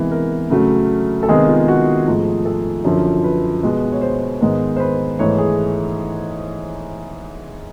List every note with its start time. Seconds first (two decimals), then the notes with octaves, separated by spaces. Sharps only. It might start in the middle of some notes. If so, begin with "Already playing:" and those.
Already playing: C3 E3 G#3 B3 A#4
0.11 A#4
0.50 C#3 F#3 A3
1.23 A4
1.28 C3 D#3 G#3 B3 G#4
1.48 F4
1.68 F#4
2.06 G#2 F3 A3 G#4
2.45 A4
2.85 F#2 D3 F3
3.24 B4
3.63 B2 G#3 B3
3.92 C#5
4.02 C5
4.41 G#2 D#3 G#3 B3
4.76 C5
4.80 B4
5.19 G#2 E3 A3 C#5
5.38 G#4